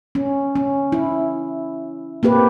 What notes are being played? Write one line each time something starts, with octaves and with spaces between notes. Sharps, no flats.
C#4
C#4
E4
A#3 C4 G4 B4